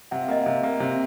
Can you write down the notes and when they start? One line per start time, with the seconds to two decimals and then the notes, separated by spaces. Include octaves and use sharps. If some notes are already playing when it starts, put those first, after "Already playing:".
0.11 C3 F#5
0.22 F5
0.28 A#3 D#5
0.41 F5
0.46 C3
0.64 A#3
0.80 C3